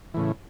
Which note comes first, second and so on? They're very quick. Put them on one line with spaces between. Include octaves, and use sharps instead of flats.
E3 A2 C#3